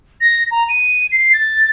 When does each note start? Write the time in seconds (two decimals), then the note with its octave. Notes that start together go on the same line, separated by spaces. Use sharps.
0.21 A#6
0.51 A#5
0.69 D#7
1.12 C7
1.33 A6